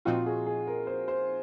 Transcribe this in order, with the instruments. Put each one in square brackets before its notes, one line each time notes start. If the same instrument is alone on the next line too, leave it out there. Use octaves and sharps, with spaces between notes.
[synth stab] A#2 F3 C4 D#4 F#4 [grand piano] F4
[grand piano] G#4
G#4
A#4
C5
C5